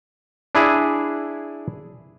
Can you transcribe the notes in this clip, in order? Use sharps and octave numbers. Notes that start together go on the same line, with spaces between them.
D4 E4 G#4